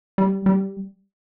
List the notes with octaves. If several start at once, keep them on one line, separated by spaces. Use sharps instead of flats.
G3
G3